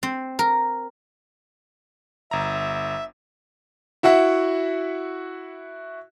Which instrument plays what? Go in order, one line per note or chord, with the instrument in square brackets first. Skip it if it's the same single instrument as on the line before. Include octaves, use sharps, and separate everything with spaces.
[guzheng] C4
A#4
[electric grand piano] G1 A#5 [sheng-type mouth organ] E5
[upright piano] E4 F#4 E5 F#5